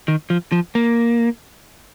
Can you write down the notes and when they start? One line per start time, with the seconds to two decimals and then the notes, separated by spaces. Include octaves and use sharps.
0.08 D#3
0.30 F3
0.52 F3
0.75 A#3